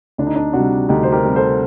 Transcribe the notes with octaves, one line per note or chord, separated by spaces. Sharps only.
D2 D4
D#4
D4
C3 G3 D4 F#4
D2 D#4 G4
C5
G4 A#4
C3 G3
A4 C5